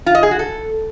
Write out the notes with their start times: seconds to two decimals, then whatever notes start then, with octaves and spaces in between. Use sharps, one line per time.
0.06 F4
0.15 D#5
0.23 G#4
0.31 F#4
0.39 A4